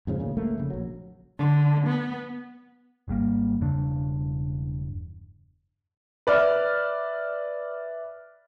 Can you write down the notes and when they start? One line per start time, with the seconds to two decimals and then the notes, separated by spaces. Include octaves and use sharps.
0.07 F2 G#2 C#3 F3
0.19 D2 A#2 C#3
0.37 C#2 A3 A#3
0.58 F1 C#3
0.70 A#1 F#3
1.39 D3
1.87 B3
3.08 G#1 G#2 G3 A#3
3.61 E1 G2 C#3 D4
6.27 B4 D5 E5 F6